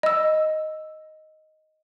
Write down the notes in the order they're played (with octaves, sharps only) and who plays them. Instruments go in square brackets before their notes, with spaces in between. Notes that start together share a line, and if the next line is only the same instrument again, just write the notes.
[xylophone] D#5 E6